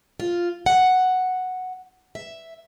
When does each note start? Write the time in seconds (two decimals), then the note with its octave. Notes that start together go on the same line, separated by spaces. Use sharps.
0.20 F4
0.66 F#5
2.15 E5